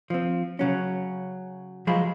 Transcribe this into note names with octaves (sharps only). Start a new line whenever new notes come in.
F3 C4
C#3 F#3 C#4
F3 F#3 G#3 G#4 B5